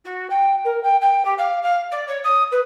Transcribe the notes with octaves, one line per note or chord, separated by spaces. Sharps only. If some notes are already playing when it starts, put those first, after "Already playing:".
F#4
G5
A#4
G5
G5
G4
F5
F5
D5
C#5
D#6
B4